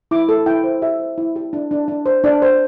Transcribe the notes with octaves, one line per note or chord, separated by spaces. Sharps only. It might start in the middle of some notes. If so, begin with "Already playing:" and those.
E4 D6
A4
E4 G5
C5
G4 E5
C5
E4
G4
D4
D4
D4
C5
D4 D5
C5